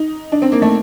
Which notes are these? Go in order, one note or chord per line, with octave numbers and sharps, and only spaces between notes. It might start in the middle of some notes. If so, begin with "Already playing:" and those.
Already playing: D#4
D4
C4
A#3
A3